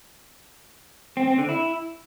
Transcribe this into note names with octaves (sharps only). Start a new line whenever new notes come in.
C4
C4
D3
E4